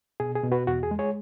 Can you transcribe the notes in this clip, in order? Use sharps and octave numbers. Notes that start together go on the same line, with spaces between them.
B2 G#4
G#4
B2
F#4 B4
E2 F#4
G#4
G#3
G#4 C#5